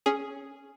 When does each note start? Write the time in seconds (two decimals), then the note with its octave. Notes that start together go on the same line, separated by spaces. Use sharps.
0.06 C#4 G#4